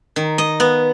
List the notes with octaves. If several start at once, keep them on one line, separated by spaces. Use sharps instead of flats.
D#3
D#5
B3